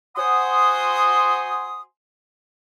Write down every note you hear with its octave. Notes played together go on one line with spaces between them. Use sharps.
F#4 C5 F#5 G#5 C6 D#6